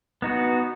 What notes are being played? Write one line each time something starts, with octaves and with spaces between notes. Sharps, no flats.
B3 D#4 F#4